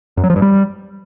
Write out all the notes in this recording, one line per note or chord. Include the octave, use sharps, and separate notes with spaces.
F#2
F#3
F3
G2
G3